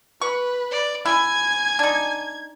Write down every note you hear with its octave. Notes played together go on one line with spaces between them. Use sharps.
B4 C#6
D5
E4 G#5 G#6
D4 D#4